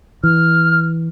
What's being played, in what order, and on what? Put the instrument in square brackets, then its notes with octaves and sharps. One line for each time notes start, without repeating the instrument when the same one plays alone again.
[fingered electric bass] E3 [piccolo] F6